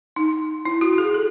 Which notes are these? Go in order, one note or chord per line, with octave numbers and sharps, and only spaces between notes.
D#4
E4
F#4
G#4
A4